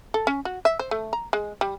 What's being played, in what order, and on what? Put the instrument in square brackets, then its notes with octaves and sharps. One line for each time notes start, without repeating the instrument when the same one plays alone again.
[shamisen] A4
C#4
F#4
E5
C5
A3
A#5
G#3
G3